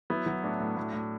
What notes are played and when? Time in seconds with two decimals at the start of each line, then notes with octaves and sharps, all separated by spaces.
0.10 F#3 B3 E4
0.26 F#3
0.43 A2 D4 F#4
0.60 A2
0.77 A2
0.93 A2